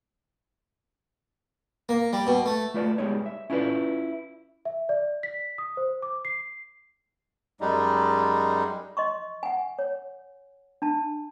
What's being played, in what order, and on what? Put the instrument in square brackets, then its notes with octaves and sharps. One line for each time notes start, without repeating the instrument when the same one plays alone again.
[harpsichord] A#3
G3
B2
A3
[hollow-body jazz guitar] A3 F4 B4 D5 D#5 A5
G3 G#3 B3 D#4 C#5
E5
C#4 E4 F4 B4 D5
[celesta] E5
D5
B6
D#6
C5
D6
C7
[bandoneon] F#2 G3 G#3 D#4
[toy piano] D#5 C6 C#6
F#5 G#5
C#5
D4 A5